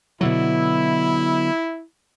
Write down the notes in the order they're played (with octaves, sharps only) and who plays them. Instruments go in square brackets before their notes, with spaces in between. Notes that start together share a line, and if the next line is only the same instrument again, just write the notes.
[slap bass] B2 D3 F#3 [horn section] E4